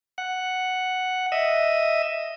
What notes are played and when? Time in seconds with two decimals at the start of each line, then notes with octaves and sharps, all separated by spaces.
0.18 F#5
1.32 D#5 E5